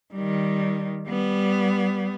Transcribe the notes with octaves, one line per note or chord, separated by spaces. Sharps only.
D#3 G3
G3 B3